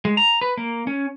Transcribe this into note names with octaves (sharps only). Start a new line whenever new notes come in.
G#3
A#5
B4
A#3
C#4